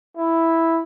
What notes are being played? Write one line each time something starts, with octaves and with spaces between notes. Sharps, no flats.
E4